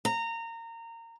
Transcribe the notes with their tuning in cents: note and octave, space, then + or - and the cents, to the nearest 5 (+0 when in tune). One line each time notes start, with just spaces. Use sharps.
A#5 -20